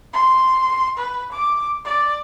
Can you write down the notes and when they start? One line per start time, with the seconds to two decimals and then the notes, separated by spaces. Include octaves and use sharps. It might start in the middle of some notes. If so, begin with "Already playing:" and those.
0.13 C6
0.97 B4
1.32 D6
1.85 D5